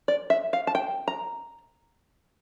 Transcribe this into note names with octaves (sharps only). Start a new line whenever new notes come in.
D5
E5
F5
A5
G5
A#5